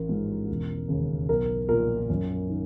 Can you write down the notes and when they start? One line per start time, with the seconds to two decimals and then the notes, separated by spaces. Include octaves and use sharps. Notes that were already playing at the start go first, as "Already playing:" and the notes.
Already playing: A1 A#4
0.09 G#2 F3 G#3
0.49 E1
0.88 D#2 C#3
1.29 B1 A#4
1.69 A#2 F3 A#4
2.10 F#2
2.50 D#3